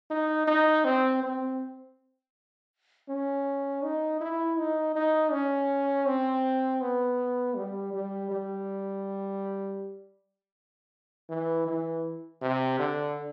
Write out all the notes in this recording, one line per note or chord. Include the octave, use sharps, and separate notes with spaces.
D#4
D#4
C4
C4
C#4
D#4
E4
D#4
D#4
C#4
C4
B3
G3
G3
G3
E3
E3
C3
D3